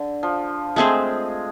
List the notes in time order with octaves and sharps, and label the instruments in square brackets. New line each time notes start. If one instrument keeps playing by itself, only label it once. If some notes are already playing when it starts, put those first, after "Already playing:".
Already playing: [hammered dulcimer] D3
F3
[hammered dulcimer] G#3 [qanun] A3 C4 G#4 C5